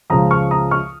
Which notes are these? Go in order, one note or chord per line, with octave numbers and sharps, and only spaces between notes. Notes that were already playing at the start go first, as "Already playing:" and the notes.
C#2 C#3 F3 A#5 D#6
C#6 F6
A#5 D#6
C#6 F6